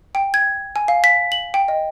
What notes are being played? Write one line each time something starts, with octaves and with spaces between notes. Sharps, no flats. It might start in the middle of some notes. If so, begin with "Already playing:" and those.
G5
G#6
G#5
F5
B6
F#7
G5
D#5